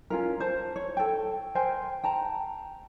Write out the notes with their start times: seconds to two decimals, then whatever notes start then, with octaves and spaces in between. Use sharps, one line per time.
0.10 C#4 F4 A#4
0.40 C5 A5
0.76 C#5
0.97 A4 G5
1.55 A#4 C5 G5 G#5
2.04 G5 A5 A#5